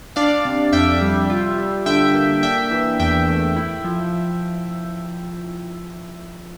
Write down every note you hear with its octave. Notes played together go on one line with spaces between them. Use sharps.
D4 D5 F5
C3
F2 E5 G5
G3
F4
G3
D3 E5 G5
A#3
D4 E5 G5
E3
E2 E5 G5
A3
E4
F3